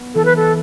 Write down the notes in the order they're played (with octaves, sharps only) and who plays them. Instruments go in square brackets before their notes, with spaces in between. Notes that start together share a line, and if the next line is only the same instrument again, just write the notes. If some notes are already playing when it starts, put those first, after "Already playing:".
Already playing: [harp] B3
[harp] E3 [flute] A4
[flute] B4
A4